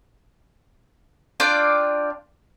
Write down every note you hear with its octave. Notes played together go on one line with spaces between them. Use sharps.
D4 F4 D5 G5